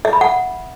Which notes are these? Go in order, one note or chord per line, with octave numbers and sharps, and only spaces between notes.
E5
B5
F#5